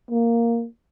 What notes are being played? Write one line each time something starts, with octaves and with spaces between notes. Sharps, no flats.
A#3